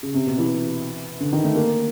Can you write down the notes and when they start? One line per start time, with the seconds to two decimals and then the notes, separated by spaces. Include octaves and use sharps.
0.03 C#3
0.14 C3
0.27 B2
0.38 E3
1.20 D3
1.32 D#3
1.44 A3
1.55 A#3